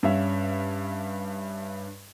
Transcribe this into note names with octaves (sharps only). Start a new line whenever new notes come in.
G2 C#4 E5 F5